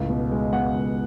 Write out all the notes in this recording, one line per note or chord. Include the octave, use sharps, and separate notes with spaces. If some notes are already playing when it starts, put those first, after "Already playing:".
Already playing: C#2 A2
B2
G#3
B2 F#5
C#2